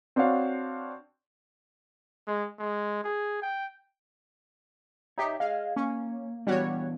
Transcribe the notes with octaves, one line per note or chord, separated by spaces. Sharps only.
C4 D4 F#4 C#5 F5
G#3
G#3
G#4
G5
D#4 G4 C#5 E5
G#4 D#5 F5
A#3 C#4
E3 G3 B3 D4 F#4 C#5